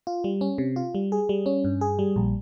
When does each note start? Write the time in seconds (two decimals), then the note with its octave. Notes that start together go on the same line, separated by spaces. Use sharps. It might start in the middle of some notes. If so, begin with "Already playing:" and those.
0.07 F4
0.24 G3
0.41 C#4
0.58 C3
0.76 F4
0.95 G3
1.12 G#4
1.29 G3
1.46 C#4
1.64 G2
1.81 G#4
1.99 G3
2.16 A#1